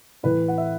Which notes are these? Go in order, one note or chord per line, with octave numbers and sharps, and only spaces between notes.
A2 E3 B4
F#5
E5